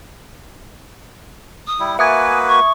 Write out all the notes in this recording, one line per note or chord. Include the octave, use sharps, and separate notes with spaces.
D#6
G3 E4
A#3 F#4 B4 E5 G#5 D#6 G#6
C#6